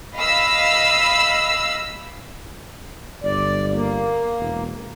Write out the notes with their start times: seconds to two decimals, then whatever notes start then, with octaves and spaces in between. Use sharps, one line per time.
0.15 D#5 F5 B5 E6
3.24 G1 D5
3.73 A#3
4.39 E1